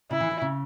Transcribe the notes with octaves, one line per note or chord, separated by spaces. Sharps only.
C#3 E4
E3
E3
C#3